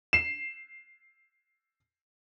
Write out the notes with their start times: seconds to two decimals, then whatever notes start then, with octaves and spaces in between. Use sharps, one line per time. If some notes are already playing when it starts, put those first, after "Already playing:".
0.13 C7 E7